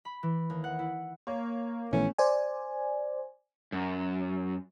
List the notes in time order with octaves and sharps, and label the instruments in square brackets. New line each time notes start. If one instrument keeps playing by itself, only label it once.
[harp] B5
E3
D#2
F#5
E4
[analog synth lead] A#3 [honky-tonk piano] C#5
[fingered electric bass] A#1 E3 [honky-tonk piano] A3 B3 [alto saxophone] C#4
[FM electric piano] C5 D5 G#5
[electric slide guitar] F#2